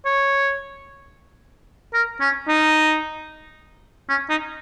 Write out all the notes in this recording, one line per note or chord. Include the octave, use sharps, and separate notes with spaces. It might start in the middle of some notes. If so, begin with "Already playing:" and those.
C#5
A#4
C#4
D#4
C#4
D#4